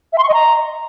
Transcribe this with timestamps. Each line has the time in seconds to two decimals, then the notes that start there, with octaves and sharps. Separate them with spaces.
0.13 E5
0.18 C6
0.23 C#6
0.29 D#5
0.34 A#5